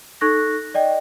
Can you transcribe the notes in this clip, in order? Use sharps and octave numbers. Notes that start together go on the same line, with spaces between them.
D#4 A4 C#6 F#6 A#6
D5 D#5 G5